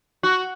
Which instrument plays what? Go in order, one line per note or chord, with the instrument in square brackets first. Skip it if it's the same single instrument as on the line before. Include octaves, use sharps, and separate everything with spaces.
[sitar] F#4